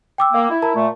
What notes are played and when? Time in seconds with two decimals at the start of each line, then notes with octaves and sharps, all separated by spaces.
0.18 G5 D6 E6
0.32 A#3
0.50 E4
0.62 A#4 A5 A#5
0.75 A#2 A3